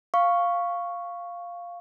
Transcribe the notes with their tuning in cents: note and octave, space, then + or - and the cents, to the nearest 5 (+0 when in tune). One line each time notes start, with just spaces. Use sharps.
F5 +0 C#6 +0